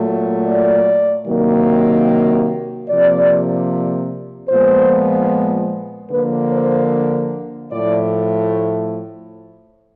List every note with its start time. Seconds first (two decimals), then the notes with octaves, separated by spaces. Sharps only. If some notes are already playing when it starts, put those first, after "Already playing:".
Already playing: A#2 F#3 A3
0.46 D5
1.26 C3 D#3 F#3 A#3
2.88 C3 F3 A#3 D5
4.49 A#2 F3 G#3 B3 C5
6.11 D3 F3 A#3 B4
6.51 C5
7.71 A2 F3 A3 D5